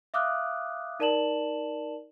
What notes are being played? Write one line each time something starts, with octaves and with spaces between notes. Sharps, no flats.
E5 F5 D6 D#6 F6 F#6
D#4 A#4 D5 A5 E7 F#7